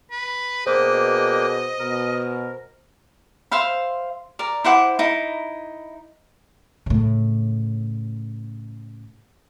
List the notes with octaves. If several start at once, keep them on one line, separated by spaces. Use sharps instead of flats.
B4
B2 A#3 D4 G#4 C5 D#5 G5
B2 A#4
C5 E5 F5 B5
A#4 D5
E4 C5 F#5 D6
D#4 E4
A2 C#3